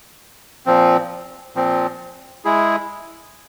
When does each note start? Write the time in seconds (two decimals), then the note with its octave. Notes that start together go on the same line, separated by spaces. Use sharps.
0.66 A#2 F3 C4
1.55 A#2 F3 C4
2.45 G#3 E4 G#4